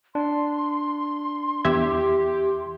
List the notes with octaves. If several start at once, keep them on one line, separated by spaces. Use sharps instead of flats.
D4 C6
E2 G4 E5 G#6